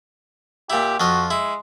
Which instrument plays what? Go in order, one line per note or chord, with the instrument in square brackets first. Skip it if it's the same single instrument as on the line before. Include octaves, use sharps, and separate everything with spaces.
[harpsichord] A#2 E4 [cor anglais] G4
[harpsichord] F2 F3 C6 [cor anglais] F#4
[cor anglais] G#3 [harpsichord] E4